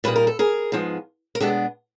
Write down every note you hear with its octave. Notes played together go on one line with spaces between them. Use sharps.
A#2 G3 A#3 D#4 B4
A#4
A4
G#4 A#4
G#2 F3 G#3 B3
A#4
B2 G#3 B3 D4 G4 A4